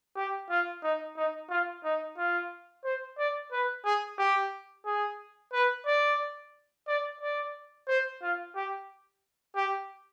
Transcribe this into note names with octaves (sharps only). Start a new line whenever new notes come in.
G4
F4
D#4
D#4
F4
D#4
F4
C5
D5
B4
G#4
G4
G#4
B4
D5
D5
D5
C5
F4
G4
G4